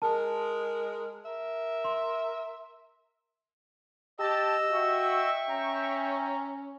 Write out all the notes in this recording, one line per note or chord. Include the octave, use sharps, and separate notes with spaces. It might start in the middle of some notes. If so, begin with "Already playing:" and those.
G#3 A#4 A5
A#4 E5
C6
G4 D#5 A5 E6
F#4 E5 G5 C#6
C#4 A#5